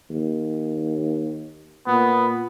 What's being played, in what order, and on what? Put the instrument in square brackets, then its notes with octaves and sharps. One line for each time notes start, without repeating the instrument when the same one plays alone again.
[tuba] D#2
[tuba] A#2 [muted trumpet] B3